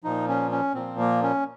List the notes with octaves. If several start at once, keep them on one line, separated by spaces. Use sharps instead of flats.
A#2 F3 D#4
C#4
C#4
A#2 F3 C4
A#3
C#4